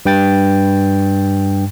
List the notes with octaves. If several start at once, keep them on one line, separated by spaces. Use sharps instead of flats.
G2 G5 A6